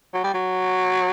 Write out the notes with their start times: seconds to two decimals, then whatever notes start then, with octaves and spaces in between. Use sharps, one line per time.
0.14 F#3
0.24 G3
0.34 F#3